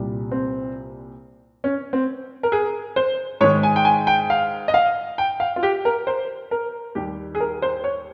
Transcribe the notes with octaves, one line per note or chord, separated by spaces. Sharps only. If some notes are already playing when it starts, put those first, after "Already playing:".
Already playing: C2 A#2 G3
C4
C#4
C4
A#4
G#4
C5
G#2 D#3 G#3 C#5
G#5
G5
G#5
G5
F5
D#5
F5
G5
F5
F4
G4
A#4
C5
A#4
D#2 D#3 G3 G4
G#4
A#4
C5
C#5